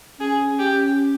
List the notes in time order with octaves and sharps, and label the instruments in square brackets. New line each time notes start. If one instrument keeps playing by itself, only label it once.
[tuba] C#4 [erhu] G#4
[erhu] G4